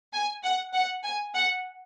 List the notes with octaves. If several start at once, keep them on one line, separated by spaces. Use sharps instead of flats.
G#5
F#5
F#5
G#5
F#5